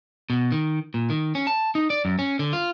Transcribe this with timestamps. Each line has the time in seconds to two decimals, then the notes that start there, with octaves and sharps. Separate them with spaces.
0.30 B2
0.52 D#3
0.94 A#2
1.10 D#3
1.35 C#4
1.47 A5
1.75 D#4
1.90 D5
2.05 F#2
2.19 C#4
2.39 D3
2.53 F4